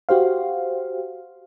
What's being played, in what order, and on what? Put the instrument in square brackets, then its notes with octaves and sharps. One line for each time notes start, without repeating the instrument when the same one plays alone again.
[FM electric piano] F#4 G4 C5 F5